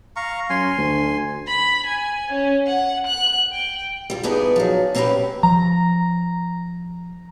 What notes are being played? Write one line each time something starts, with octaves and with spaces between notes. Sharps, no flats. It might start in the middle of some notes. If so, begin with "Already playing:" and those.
F5 A#5 C#6
F#2 G#5 C6
D2
B5
G#5
C#4
F#5
F#6
G5
F2 G3
E2 G2 B3 D#4 G#4 D5
F3 F#3
A#3 C4 C#4 F#4 G4 B4
F3 A#5